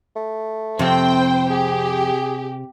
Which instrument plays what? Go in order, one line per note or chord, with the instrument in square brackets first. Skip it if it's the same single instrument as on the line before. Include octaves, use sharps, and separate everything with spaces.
[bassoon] A3
[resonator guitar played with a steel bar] F2 C4 [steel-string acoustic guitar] C3 [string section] C5 G5
[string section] G4 [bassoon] G#4